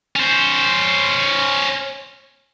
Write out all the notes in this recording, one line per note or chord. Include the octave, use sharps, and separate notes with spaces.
C#4 C5